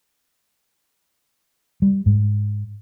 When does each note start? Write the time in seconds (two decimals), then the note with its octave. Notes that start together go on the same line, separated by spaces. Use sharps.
1.82 G3
2.06 G#2